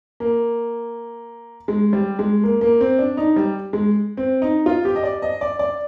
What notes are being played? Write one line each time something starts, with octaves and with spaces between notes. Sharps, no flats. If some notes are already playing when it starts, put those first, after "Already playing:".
A#3
G#3
G3
G#3
A#3
A#3
C4
D4
D#4
G3
G#3
C4
D#4
F4
G4
D#5
D5
D#5
D5
D5